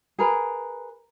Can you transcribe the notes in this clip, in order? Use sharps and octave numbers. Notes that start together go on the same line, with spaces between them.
G#4 A#4 B4